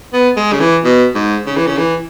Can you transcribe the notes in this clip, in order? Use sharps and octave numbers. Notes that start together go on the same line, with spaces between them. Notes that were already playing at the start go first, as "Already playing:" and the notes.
B3
G#3
C#3
E3
B2
G#2
C#3
E3
C#3
E3